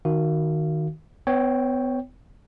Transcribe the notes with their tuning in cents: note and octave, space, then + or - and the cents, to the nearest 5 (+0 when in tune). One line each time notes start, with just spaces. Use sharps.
D#3 +0 F#4 +0 F5 -35
B3 +35 C#5 +0 G5 +0